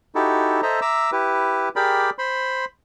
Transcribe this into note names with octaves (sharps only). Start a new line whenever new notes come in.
D#4 E4 F#4 G4 A4
A4 C5 D#5 E5 A#5
E5 A#5 D6 E6
E4 G4 B4
G4 G#4 A#4 D5 G5 B5
C5 B5 C6